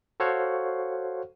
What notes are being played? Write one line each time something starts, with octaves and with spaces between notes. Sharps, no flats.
F#4 A4 C5 C#5 F5 F#5